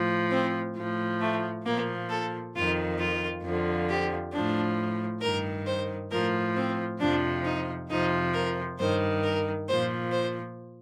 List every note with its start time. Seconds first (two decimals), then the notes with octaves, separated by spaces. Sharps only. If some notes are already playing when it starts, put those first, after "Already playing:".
Already playing: A2 F3
0.31 C4
0.77 A2 F3
1.21 A3
1.65 A#2 F3 A#3
2.10 A4
2.55 F2 D#3 F4
2.99 F4
3.43 F2 D3 F3
3.89 G4
4.33 A2 F3 D4
5.22 G2 D#3 A#4
5.66 C5
6.12 A2 F3 A#4
6.56 C4
7.00 F2 C3 F3 D4
7.45 D#4
7.90 F2 C3 F3 D#4
8.34 A#4
8.79 G2 D#3 C5
9.24 A#4
9.68 A#2 F3 C5
10.12 C5